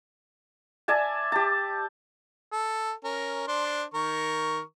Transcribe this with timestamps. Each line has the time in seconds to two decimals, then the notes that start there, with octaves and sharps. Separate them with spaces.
0.88 D5 E5 G#5 A5
1.32 G4 A5
2.52 A4
3.04 C#4 A#4
3.48 D4 C5
3.94 D#3 A#4 C#6